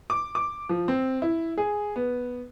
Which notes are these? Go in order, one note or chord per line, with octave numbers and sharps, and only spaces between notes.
D6
D6
F3
C4
E4
G#4
B3